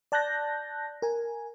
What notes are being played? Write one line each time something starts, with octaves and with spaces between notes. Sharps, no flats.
D5 A5 F#6 G6 A#6
A#4 G#5